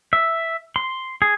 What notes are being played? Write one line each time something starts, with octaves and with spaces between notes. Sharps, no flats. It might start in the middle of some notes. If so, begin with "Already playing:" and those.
E5
C6
G#4